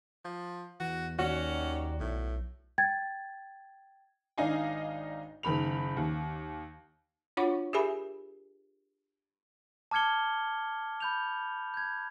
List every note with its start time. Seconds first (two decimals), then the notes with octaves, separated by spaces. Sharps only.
0.25 F3
0.80 E2 F#4
1.19 D#2 D#3 C#4 F#4 D5
2.00 B1 A2
2.78 G5 G#6 A6
4.38 G#1 D4 D#4 D#5 F5 G#5
5.43 F#1 D#3 B5 F7
5.97 D#2
7.37 D4 F4 F#4 C#5 F#5 C#6
7.73 G4 G#4 A#4 E5 G#5 B5
9.91 A5 D6 F6 G#6 C#7 G7
11.00 B5 G6 F7
11.74 G6 G#6